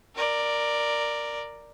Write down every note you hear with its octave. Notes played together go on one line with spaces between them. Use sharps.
A#4 D5